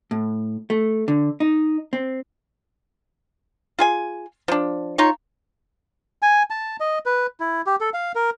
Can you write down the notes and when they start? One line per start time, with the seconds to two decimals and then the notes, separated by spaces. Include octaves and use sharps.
0.11 A2
0.70 A3
1.08 D3
1.40 D#4
1.93 C4
3.79 F4 G#4 G#5
4.48 F3 D4
4.98 D#4 F4 C#5
6.22 G#5
6.50 A5
6.80 D#5
7.06 B4
7.40 E4
7.66 G4
7.81 A4
7.94 F5
8.15 A#4